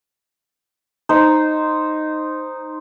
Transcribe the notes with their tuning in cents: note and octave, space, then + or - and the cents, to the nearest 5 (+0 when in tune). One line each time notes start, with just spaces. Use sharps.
D#4 -5 C5 +0